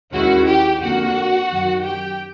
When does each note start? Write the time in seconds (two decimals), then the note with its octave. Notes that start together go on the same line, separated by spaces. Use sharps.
0.13 D#2 D#3 G#3 C#4 E4 F#4 F#5
0.46 G4 G5
0.81 F2 D3 G3 A#3 F#4 F#5
1.49 F#2 D#3 F#3
1.83 G4 G5